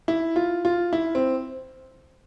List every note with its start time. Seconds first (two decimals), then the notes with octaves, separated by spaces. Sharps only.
0.08 E4
0.36 F4
0.65 F4
0.93 E4
1.15 C4